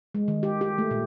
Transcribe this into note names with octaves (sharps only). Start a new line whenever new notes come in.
G#3
D#3
G4
G4
A3
A#2